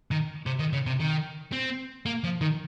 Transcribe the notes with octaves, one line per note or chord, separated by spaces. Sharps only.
D#3
C3
D#3
C#3
C3
D#3
C4
A#3
F3
D#3